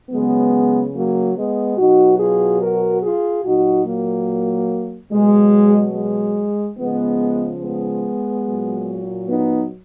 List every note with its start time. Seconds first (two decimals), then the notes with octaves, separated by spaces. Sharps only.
0.10 C#3 F#3 G#3 B3
0.94 F#3 A#3
1.37 G#3 B3
1.78 B2 F#3 D#4 F#4
2.19 F4 G#4
2.61 F#4 A#4
3.03 F4 G#4
3.44 A#2 F#3 D#4 F#4
3.86 F#3 A#3
5.12 B2 F#3 G#3
5.95 G#3
6.78 C#3 F3 G#3 B3
7.61 G#3 B3
8.46 A#2 F#3
9.28 B3 D#4